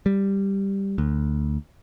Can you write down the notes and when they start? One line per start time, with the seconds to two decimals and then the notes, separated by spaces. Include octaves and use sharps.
0.06 G3
0.98 D2